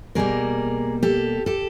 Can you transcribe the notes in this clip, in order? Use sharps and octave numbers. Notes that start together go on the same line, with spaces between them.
B2 G3 A#3 G#4 A#4
G4 A4
G4 A4